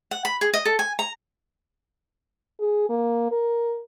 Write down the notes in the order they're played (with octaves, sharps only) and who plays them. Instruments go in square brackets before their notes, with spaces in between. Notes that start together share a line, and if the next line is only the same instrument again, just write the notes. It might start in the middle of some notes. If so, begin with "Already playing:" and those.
[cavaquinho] F#5
B5
G#4
D#5
A4
G#5
A#5
[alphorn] G#4
A#3
A#4